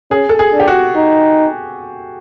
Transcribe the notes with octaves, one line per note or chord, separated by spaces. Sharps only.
C#4 G#4
A4
G#4
D4
G4
F#4
D#4